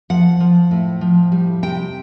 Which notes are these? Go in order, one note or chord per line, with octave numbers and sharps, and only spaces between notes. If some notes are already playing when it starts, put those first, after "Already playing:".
F3 F#5
F3
A2
F3
G3
C3 G5